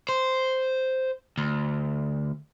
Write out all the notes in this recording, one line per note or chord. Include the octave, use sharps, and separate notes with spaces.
C5
D2